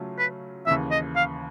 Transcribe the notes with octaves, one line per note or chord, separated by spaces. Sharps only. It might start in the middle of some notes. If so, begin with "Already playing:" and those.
Already playing: C#3 F#3 A3 C#4 F4
B4
D#2 C#3 E3 E5
D#5
F5